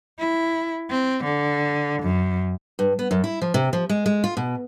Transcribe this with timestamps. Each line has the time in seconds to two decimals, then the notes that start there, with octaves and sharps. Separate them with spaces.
0.19 E4
0.90 C4
1.24 D3
2.03 F#2
2.79 G2
2.99 B3
3.11 F#2
3.24 E4
3.42 F3
3.54 C3
3.73 F3
3.89 G#3
4.06 G#3
4.24 F4
4.37 B2